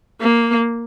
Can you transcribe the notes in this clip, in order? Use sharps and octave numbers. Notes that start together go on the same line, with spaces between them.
A#3